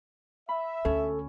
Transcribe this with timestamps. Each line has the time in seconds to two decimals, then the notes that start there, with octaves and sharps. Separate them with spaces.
0.49 E5 B5
0.85 D2 C#4 A4